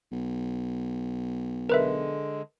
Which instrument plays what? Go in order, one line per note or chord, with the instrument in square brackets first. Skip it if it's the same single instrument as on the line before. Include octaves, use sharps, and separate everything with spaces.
[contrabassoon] B1
[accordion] D3 G#3 [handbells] A#4 B4 E5